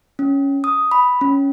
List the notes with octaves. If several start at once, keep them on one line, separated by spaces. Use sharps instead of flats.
C#4
D#6
B5
C#4